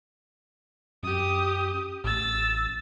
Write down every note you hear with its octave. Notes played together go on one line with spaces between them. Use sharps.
F#2 G4 D#6
A1 E6 A6